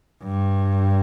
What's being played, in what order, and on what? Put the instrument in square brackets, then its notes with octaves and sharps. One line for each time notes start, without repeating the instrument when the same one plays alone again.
[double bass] G2